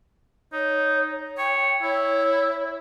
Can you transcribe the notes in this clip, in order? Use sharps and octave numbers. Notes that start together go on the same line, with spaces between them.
D#4 C#5
C#5 G5
E4 C#5